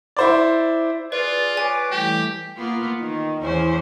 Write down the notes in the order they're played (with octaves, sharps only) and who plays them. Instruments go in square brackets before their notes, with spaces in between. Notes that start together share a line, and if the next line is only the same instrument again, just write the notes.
[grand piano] E4 C5 D5
[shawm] F4 [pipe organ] G#4 [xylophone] B4 [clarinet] D5
[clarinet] B4 [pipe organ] C#5 D6 [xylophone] G#5
[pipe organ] E3 G3 A3 [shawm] G4 [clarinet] G5
[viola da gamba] A#3 B3 F4
D#3
E2 C#4 C5